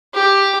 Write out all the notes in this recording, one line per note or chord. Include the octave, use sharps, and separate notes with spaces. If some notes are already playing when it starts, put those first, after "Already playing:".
G4